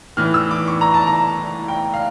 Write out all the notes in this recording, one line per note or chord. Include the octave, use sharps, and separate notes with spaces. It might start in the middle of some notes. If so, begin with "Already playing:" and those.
A2 E3 F6
E6
D6
C#6
A#5
A5
A#5
G5
F5